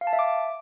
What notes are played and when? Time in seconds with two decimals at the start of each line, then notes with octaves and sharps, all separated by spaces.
0.01 F5
0.07 A5
0.13 E5
0.19 D6